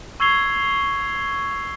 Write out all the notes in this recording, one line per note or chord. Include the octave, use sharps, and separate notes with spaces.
C#6 E6 G#6 C7 F7 G7